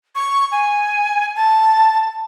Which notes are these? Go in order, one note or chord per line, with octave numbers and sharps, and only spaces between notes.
C#6
G#5
A5